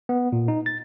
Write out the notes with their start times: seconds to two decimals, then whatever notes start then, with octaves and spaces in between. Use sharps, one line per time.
0.09 B3
0.32 A#2
0.48 D#4
0.66 A6